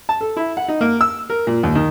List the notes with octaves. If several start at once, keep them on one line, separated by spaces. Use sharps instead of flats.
A5
A4
E4
F#5
D#4
A#3
E6
A#4
A#2
D#2
D#3